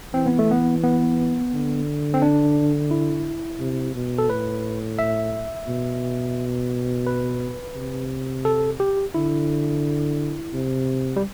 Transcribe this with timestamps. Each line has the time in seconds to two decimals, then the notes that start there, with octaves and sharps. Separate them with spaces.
0.14 E3 C4
0.26 B3
0.39 A3
0.51 B3
0.83 B3
1.53 D3
2.14 C4
2.22 D4
2.91 E4
3.60 C3
3.95 B2
4.18 A4
4.29 A2 B4
4.99 E5
5.67 B2
7.07 B4
7.75 C3
8.45 A4
8.80 G4
9.14 D3 E4
10.53 C3
11.16 G3